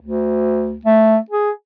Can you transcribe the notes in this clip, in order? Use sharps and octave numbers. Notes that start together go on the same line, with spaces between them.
D2
A3
G#4